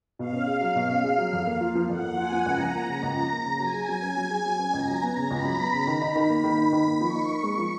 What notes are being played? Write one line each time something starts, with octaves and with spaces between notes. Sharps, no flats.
B2 F5
C#4
G#4
F#3
B2
C#4
G#4
F#3
F2
A#3
F4
F3
F2 F#5
A#3
F4 G#5
F3
C#2 A#5
F3
A#3
C#3
C#2
F3
A#3
C#3
F#3 G#5
G#4
F#3
C#4
F#3
G#4
F#3
C#4
C#2 A#5
F#3
B3 A#5
C#3
C#2 B5
F#3
B3
C#3
D#3
D#4
D#3
A#3
D#3
D#4
D#3
A#3
F3 C#6
D#4
A#4
G#3
F3